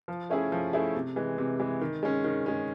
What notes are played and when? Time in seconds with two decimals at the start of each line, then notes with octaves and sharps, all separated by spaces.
0.08 F3
0.30 A3 C#4 E4 G#4
0.52 F3
0.73 A3 C#4 E4 G#4
0.95 C3
1.16 E3 G#3
1.38 C3
1.60 E3 G#3
1.81 D#3
2.03 G#3 C#4
2.24 D#3
2.46 G#3 C#4